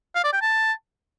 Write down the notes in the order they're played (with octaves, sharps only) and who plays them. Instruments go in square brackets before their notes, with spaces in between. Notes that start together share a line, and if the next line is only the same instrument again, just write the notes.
[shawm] F5
D5
G5
A5